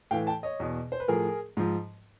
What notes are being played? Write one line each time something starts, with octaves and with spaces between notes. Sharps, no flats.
A2 E3 F5 G5
G5 A5
C#5 D#5
E2 B2
C5
B4
A2 F3 G#4 A#4
G#2 F3